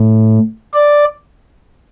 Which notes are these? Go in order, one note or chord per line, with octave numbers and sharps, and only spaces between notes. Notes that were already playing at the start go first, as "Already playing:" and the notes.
Already playing: A2
D5